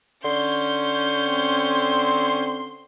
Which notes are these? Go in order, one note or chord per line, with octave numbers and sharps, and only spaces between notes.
D3 C#4 C6 G6
C4